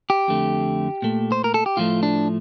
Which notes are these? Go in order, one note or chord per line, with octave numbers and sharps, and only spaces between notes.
G4
F2 D3 A3
A#2 A3
C5
A#4
A4
G4
A2 F3 A3 F4
D4